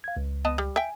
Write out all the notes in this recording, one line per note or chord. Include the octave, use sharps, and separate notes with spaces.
F5 G#6
C#2
B3 D#5 A5
G3
E5 G5 G#5